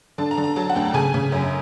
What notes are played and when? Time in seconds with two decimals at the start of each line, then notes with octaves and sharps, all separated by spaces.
0.18 D3 A5
0.31 A#5
0.38 D3
0.44 A#5
0.56 F#3 A5
0.69 F#5
0.75 D2 G5
0.85 A5
0.94 C#3 G#5
1.14 C#3
1.32 F#2